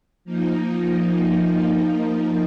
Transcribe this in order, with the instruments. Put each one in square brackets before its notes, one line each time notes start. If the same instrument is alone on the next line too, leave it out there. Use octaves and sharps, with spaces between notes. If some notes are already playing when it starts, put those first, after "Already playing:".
[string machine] F3 A#3 D#4